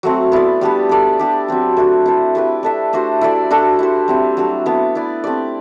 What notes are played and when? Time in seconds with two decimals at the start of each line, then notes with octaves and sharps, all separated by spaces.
0.03 F#3 A3 C4
0.32 B3 E4 A4 D5
0.61 G3 B3 D4 G4
0.89 D4 A4 D5
1.19 D4 G4 D5
1.48 F#3 C4 G4
1.77 A3 D4 F#4
2.06 E4 A4 C5
2.35 A3 E4 G4 B4
2.63 D4 A4 E5
2.93 A3 D4 F#4 C5
3.21 E4 A4 D5
3.50 D4 F#4 A4 D5
3.79 E4 G4 C5
4.08 G3 C4 E4
4.37 F#3 A3 D4
4.66 B3 E4 A4
4.95 E4 B4 D5
5.24 A3 C4 G4 D5